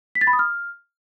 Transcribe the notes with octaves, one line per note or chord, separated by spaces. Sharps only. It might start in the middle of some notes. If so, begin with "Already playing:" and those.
B6
A6
B5
D#6
F6